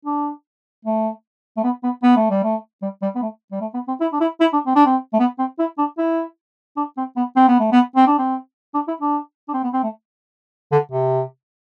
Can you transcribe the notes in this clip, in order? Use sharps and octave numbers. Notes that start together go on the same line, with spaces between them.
D4
A3
A3
B3
B3
B3
A3
G3
A3
G3
G3
B3
A3
G3
A3
B3
C4
E4
D4
E4
E4
D4
C4
D4
C4
A3
B3
C4
E4
D4
E4
D4
C4
B3
C4
B3
A3
B3
C4
D4
C4
D4
E4
D4
D4
C4
B3
C4
A3
D3
C3